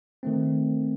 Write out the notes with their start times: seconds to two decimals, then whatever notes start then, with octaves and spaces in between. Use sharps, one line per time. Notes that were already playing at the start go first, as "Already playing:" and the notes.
0.23 D#3 A3 C4